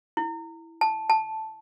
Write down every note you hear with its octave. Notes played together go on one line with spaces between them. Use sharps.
E4
A5
A5